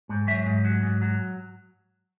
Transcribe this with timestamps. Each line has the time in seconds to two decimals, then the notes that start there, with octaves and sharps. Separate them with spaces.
0.09 G#2
0.27 F#3 E5
0.46 G#2
0.65 F#3
0.83 G#2
1.02 F#3